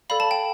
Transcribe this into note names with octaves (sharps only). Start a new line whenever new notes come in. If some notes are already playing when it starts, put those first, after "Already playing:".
A4 D5 F5 B5
A5
G5